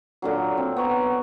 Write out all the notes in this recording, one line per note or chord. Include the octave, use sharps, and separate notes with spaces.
A#2 D3 F#3
C4
B3 C#5 A#5